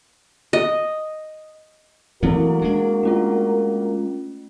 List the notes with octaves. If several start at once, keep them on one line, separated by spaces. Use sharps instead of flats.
D#5
E3 F#3 A3 A#3 C4 E4 F#4 A#4
G#3 D4
A3 C#4 F4